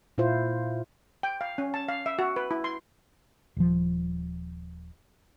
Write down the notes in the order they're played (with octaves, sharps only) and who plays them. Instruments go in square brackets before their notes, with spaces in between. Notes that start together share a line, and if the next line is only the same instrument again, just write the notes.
[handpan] A#2 E4 F4 C5
[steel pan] G5
F5
C#4
A5
F5
E5
F#4
B4
E4
C6
[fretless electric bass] D#1 F3